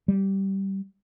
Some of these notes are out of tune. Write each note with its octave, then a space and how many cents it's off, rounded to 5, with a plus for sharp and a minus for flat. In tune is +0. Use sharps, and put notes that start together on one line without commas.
G3 -15